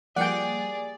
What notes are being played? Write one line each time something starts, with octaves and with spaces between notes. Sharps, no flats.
F3 G3 A#3 G#4 D5 F#5 G5